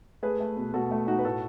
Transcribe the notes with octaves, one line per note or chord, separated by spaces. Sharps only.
A3 G#4 B4
A3
B2
B2 F#4 A4
A3
A3 D#4 F#4
B4
A2 F#4 A4